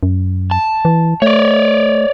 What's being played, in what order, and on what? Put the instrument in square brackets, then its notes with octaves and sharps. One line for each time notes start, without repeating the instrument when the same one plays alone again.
[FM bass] F#2
[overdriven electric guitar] A5
[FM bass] E3
[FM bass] A3 [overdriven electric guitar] C#5 D5